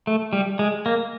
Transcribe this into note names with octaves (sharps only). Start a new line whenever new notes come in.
A3
G3
G#3
A#3